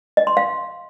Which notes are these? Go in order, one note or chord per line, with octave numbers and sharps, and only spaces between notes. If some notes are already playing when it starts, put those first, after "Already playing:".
D#5
C6
F5